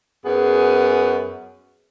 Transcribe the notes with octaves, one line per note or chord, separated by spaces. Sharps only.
F#2 B3 G#4